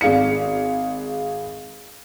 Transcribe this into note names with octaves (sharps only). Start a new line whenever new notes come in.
G#1 G#4 F5 C#7